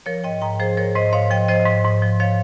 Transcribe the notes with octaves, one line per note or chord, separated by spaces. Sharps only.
F3 A#4 C#5
G#2 D#5 G5
G#2 G5 A#5
F3 G#4 C5
F3 A#4 C#5
G#2 C5 D#5
G#2 C#5 F5
F3 D#5 G5
F3 C5 D#5
G#2
G#2
F3
F3 C#5 F5